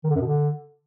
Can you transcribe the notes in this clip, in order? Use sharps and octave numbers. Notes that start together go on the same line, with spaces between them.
D#3
D3
F#2
B2
D3